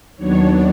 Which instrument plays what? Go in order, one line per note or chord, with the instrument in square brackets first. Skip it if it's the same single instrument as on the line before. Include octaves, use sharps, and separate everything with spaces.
[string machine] D#2 D#3 F#3 B3 D4 C#5